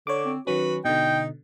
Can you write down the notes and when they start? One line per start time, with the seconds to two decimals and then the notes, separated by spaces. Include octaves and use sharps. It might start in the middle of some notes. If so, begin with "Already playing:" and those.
0.07 D3 C#5 D6
0.25 C4
0.47 D#3 F#3 C#4 F#4 B4
0.85 B2 D3 D#4 G5